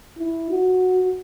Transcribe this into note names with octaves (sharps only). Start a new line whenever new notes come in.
E4
F#4